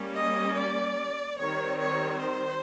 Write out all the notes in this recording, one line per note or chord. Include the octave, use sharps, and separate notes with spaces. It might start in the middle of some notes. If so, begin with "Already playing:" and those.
Already playing: G3 A#3 C#4
D#5
D5
D#3 G3 C4 C#5
C#5
C5